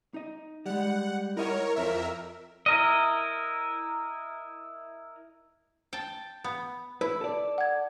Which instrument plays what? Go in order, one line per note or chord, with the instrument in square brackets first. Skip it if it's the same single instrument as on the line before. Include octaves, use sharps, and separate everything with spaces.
[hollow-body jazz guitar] D#4 D#5
[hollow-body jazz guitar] G3 G#3 [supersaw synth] F#5
[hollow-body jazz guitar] E4 D#5 F#5 [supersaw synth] A#4 C#5
[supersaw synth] F2 A#4 E5
[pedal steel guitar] E4 A#4 D#5
[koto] G5 A5
B3
[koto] E4 [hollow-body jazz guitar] B4
[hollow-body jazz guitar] A4 D5
[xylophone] F#5 G#6